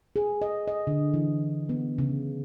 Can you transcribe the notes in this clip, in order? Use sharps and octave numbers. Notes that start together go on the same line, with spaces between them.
G#4
D#5
D#5
D3
E3
B3
C#3